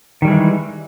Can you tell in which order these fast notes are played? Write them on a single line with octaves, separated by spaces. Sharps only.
D#3 G3 G#3 E3